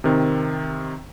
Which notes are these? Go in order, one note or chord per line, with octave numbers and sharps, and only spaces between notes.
C3 D#3 C4